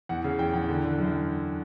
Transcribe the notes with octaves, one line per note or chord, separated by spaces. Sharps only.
E2 F#5
C#3
E2 G5
E2
D3
D3
F#2